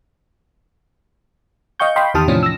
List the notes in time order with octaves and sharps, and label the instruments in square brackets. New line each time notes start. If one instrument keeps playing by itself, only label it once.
[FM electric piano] D#5 F5 G5 C#6 G6
D#5 F5 G5 B5 C6
E2 D#3 G4 A5 D#6 F6
A2 C3 E3 F3 C#4 D4
E6 A#6